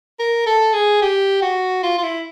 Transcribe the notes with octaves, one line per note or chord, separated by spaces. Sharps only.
A#4
A4
G#4
G4
F#4
F4
F4
E4